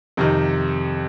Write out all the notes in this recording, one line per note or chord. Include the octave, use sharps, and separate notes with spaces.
F2 C3 D#3